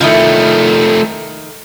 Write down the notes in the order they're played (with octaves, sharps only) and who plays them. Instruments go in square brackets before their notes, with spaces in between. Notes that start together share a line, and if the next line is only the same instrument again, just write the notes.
[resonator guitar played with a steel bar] D#3 D#4 E4 [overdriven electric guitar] F3 A3